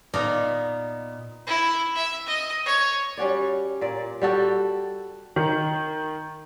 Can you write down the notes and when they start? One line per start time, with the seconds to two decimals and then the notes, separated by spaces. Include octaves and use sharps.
0.14 A#2 B3 D#4 D5 A#5
1.47 E4
1.95 E5
2.27 D#5
2.66 C#5
3.17 G3 C#4 F#4 D5
3.81 A#2 D5
4.22 G3 F#4 A4 G5
5.36 D#3